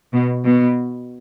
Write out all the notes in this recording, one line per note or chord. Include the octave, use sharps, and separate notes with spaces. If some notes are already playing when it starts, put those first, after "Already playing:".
B2
B2